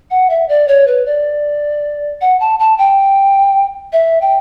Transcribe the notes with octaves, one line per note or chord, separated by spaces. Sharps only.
F#5
E5
D5
C#5
B4
D5
F#5
A5
A5
G5
E5
G5